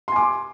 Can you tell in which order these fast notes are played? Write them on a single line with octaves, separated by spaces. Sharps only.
C6 G#5 D6